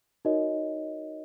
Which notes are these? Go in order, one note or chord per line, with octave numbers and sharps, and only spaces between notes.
D#4 F#4 A#4 C#5 D#5